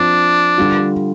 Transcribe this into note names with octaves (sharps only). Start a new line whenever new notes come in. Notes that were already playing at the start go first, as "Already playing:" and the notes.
Already playing: F3 C4 D4 F4
D3 G3 F4